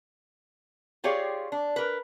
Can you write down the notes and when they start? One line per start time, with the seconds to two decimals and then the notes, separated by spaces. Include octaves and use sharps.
1.04 F4 G4 G#4 C#5 D5 F5
1.52 D4
1.76 A#4 B4